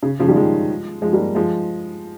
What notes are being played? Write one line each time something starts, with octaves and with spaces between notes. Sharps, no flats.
C#3
C#3 F3
D#3 G3
F3 G#3
F3 G#3
G3 A#3
F3 G#3